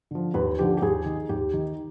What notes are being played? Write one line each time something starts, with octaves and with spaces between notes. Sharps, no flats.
D3 F3
D#2 B4
D3 F3 G4
G4
D#2 G#4
D#3
D#2 G4
D#3